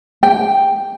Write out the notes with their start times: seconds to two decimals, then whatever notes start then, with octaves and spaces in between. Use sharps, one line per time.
0.23 G5